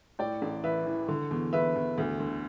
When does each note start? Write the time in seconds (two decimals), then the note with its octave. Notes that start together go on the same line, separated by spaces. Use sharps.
0.19 A2 D5 G5
0.42 A1
0.63 E3 B4 E5
0.86 E3
1.08 D3
1.31 E2
1.53 E2 B4 E5
1.75 E2
1.98 D2
2.20 D3